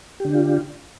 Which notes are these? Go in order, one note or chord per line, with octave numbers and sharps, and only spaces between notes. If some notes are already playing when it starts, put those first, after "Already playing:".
D3 D4 F4 G4